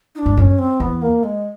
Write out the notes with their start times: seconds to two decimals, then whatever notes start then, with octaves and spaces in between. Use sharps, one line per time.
0.15 D#4
0.19 D4
0.26 G2
0.37 F#2 C#4 D4
0.59 C4
0.80 E2 B3
1.02 A#3
1.23 G#3